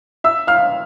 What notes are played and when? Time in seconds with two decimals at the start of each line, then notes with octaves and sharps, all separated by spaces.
0.24 E5 E6
0.47 F5 F6